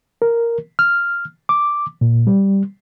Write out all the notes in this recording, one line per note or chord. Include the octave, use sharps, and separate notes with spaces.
A#4
F6
D6
A#2
G3